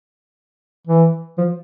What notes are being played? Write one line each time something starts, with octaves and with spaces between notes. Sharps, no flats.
E3
F3